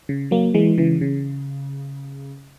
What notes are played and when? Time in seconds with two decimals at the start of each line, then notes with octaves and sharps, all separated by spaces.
0.09 C#3
0.31 F#3 A#3
0.54 E3 G#3
0.78 C#3 E3
1.01 C#3